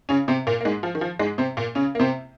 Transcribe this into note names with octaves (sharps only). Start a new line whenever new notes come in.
C#3 C#4
C3 C4
A#2 A#3
A#3
G#2 G#3
F3
D#3
F3
G#2 G#3
C3 C4
A#2 A#3
C#3 C#4
A#3
C3 C4